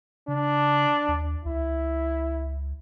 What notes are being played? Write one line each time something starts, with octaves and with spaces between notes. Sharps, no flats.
C#3 D4
D#2
C#2 E4